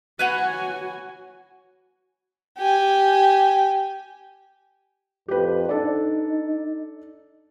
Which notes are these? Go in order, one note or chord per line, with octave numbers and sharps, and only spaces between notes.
F#4 B4 C#5 F#5 G#5
G4 G#5
F2 G4 B4
D4 D#4 A4 D5